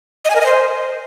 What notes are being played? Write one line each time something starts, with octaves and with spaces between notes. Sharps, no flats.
D#5
G#5
A#4
D#5
C5